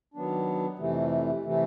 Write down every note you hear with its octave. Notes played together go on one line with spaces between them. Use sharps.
D#3 F#3 B3 D4
F2 C3 E3 A3
C3 E3 A3